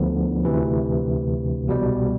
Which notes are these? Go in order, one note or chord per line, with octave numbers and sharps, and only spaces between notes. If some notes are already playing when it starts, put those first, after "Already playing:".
Already playing: D2 D3 F3 B3
D2 C3 E3
C2 B2 G3